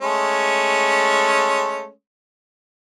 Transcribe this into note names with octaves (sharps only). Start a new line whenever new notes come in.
G#3 A3 C#4